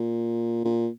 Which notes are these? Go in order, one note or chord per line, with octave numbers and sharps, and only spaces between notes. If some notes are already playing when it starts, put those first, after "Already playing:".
Already playing: A#2
A#2